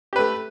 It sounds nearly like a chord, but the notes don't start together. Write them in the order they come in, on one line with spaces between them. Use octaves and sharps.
G4 B4 A3